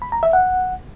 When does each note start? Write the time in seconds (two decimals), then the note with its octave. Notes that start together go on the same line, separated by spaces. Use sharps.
0.02 B5
0.12 A#5
0.23 E5
0.33 F#5